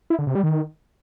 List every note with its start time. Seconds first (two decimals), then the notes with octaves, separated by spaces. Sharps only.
0.10 E4
0.19 D3
0.27 C3
0.35 G3
0.44 D#3